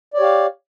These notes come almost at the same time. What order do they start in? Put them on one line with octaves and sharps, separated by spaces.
D5 C#5 G4 F5